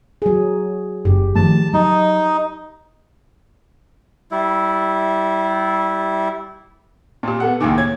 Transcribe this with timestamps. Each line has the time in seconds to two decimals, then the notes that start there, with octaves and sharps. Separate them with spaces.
0.22 F#3 G#4
1.05 F#1 G4
1.35 D#3 F3 A3 A5
1.74 F#3 D#4
4.31 G3 E4
7.23 A#2 C4 G4
7.40 B3 A4 F#5
7.61 C#2 A2 D#3 A#3 G#5 D6
7.78 C#5 G#6